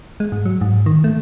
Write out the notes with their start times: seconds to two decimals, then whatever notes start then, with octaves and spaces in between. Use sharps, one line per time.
0.20 G#3
0.32 G#2
0.46 F#3
0.61 G#2
0.86 D#3
1.04 A3